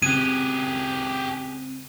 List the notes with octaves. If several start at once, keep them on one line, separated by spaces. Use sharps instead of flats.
C#3 C4 G4 G#4 F#6 D#7